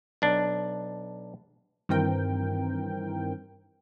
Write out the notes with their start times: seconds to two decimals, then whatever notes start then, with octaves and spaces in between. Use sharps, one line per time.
0.22 B1 D4
1.89 G2 D#3 E3 C4 A#4 G5